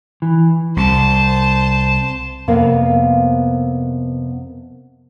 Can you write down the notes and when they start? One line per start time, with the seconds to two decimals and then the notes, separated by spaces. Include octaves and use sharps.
0.22 E3
0.77 C2 C5 A5
2.48 F2 C3 A#3 B3 A#4 F5